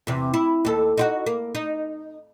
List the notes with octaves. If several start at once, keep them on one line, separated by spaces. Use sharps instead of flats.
E2 C3
E4
D#2 A4
D#4 F4 F#4
A#3
D#4